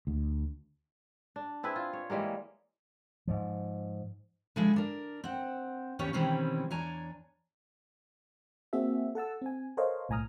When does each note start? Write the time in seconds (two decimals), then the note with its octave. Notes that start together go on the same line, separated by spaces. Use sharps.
0.07 D2
1.36 D4
1.63 C4 E4 G#4 B4
1.76 F4
1.93 C#5
2.10 E3 G3 G#3 A#3
3.27 G#2 F3
4.56 D3 F3 G#3 E4 G#4
4.76 D4 A#4
5.24 C4 F#5
5.99 D#2 B3 C#4 G4 C#5
6.13 B2 D#3 E3 G3 C4 C#4
6.70 E2 D4 C#5 G#5 A#5
8.73 A#3 C4 F#4 G#4 E5
9.15 A4 F#5 A5 E6
9.42 C4 G#5
9.77 A4 A#4 C5 C#5 D#5 F5
10.09 B1 A2 G#5 A#5 D#6 F6